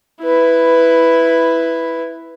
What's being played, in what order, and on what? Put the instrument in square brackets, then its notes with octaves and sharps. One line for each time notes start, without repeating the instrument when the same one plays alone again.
[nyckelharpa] E4 B4